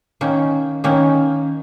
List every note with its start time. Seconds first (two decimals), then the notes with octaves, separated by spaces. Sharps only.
0.21 D#3 A#3 C#4
0.84 D#3 A#3 C#4